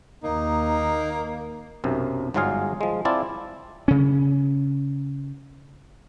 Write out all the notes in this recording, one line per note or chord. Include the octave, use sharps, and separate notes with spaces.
D#2 A#3 D#4
B1 F#2 C3
G1 G#2 F#3 F4 G#4 F5
F3 G#3
C4 E4 F4 D5 A5
C#3 C#4